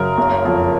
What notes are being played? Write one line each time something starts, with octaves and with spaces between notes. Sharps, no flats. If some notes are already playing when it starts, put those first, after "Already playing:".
Already playing: F#2 C#3 A#4
F#1
F2